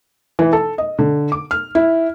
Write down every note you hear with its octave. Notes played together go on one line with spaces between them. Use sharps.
E3
A4
D#5
D3
D6
F6
E4